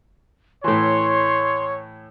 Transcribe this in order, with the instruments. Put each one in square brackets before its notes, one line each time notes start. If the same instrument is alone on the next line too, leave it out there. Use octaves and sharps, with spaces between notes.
[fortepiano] A2 E3 [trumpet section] C#5 [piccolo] C6